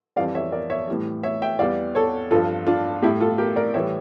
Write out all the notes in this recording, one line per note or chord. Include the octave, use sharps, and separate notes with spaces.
F2 E3 G3 D5 F5
C#5 E5
A#4 D5
C#5 E5
A2 E3 G3
C#5 E5
E5 G5
E2 E3 G3 D5 F5
A4 C#5
G2 F3 F4 A4
D4 F4
A2 G3 E4 G4
F4 A4
G4 A#4
A#4 D5
A2 E3 G3 C#5 E5